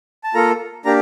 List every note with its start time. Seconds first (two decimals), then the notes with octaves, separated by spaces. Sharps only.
0.24 A5
0.34 A#3 F4 A4 A#5
0.85 A#3 D4 G4 A#5